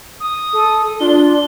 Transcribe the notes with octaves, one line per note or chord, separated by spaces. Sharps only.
D#6
A4
D4 F4 G7